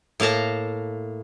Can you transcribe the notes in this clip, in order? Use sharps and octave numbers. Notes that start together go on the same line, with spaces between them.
A2 A#3 F5 A5 A#5